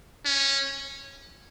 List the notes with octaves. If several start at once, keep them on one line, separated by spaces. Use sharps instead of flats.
C#4